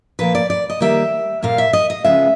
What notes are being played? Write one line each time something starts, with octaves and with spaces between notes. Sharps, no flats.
A#2 F3 A#3 B4
D5
D5
D#5
D#3 G3 A#3 E5
A#2 G3 A#3 F5
E5
D#5
D#5
C#3 F3 G#3 B3 E5